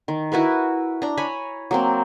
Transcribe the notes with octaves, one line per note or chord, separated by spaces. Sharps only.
D#3
E4 F#4 A#4 B4
D4 A#5
C#5 G#5 A#5 B5
F#3 A#3 C4